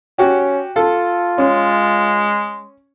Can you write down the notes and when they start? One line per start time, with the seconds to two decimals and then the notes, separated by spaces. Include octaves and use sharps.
0.18 C#4 F#4 G4
0.76 F4 A4
1.38 G#3 C#4